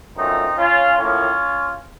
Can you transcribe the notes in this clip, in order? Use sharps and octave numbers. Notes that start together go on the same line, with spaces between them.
F#2 F3 A3 C4 D#4
C#4 F4
A2 F3 A#3 C#4 F4